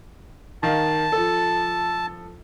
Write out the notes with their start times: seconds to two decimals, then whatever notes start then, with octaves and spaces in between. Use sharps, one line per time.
0.63 D#3 F5 A5
1.12 F3 A4